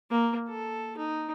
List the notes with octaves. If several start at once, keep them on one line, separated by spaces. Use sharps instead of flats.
A#3
A4
D#4